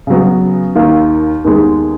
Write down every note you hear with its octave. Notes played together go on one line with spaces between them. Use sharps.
C#3 F#3 B3
D#2 D#3 A#3
D#2 D#3 G#3 B3